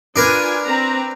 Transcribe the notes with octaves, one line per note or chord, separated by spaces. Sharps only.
D4 F4 A#4 B4 G#5
C4 A#5